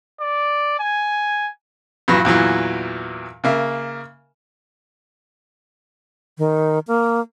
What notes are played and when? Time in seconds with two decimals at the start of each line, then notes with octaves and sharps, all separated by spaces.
0.20 D5
0.80 G#5
2.08 G2 A#2 E3 F#3
2.25 E2 A#2 E3 F#3
3.44 C#3 A#3 E5
6.38 D#3
6.88 A#3